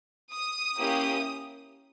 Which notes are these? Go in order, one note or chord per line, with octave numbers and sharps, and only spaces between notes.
D#6
A#3 C#4 E4 G4